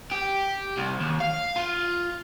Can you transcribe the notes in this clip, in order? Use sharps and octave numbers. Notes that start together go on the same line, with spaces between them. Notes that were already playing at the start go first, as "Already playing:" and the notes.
G4
C2
D#2
F5
F4